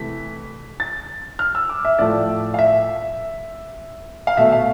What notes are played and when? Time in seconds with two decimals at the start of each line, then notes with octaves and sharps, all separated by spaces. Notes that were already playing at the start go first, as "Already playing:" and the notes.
Already playing: C3 E3 A3 B6
0.80 A6
1.39 F6
1.55 E6
1.69 D6
1.85 E5
1.99 A2 F3 A3 D5
2.54 F5
2.59 E5
4.27 F5
4.37 B2 A3 E5
4.52 F5